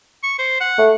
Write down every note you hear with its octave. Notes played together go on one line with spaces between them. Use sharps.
C#6
C5
F#5
A3